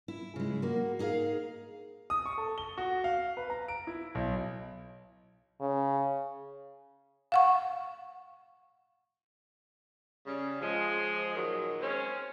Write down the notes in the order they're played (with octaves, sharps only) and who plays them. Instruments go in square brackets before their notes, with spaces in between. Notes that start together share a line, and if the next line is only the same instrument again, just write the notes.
[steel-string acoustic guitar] E4
C#3 G#3
A#3 F#4
D#4 G#4 A#4 F5
[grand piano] D#6
C#6
A4
G7
F#4
F5
B4
A#5
D7
E4
B1
[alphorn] C#3
[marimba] F5 F#5 C#6
[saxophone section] C#3 G3
F3 G#3
A#2 D#3 F#3
G#3 C4 C#4